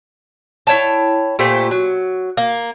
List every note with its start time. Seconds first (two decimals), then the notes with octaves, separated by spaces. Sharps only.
0.67 E4 C#5 G5 A5
1.39 A#2 A3 G4 C5
1.71 F#3
2.37 A#3